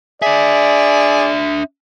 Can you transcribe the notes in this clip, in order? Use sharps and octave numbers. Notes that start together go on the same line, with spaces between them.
D4 G#4 D5 E5